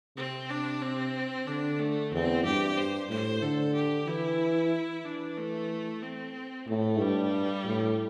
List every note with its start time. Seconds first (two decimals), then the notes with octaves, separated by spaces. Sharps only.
0.17 C3 C4
0.50 D4
0.82 C4
1.47 D3 D4
1.79 A3
2.12 E2 C4
2.44 G2 G4
2.77 C5
3.10 A2 C5
3.42 D3 A4
3.74 G4
4.07 E3 E4
5.05 E3 D4
5.38 A3
6.03 C4
6.68 A2 A3
7.00 G2 G3
7.65 A2